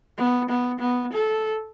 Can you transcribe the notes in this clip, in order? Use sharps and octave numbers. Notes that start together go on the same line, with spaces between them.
B3
B3
B3
A4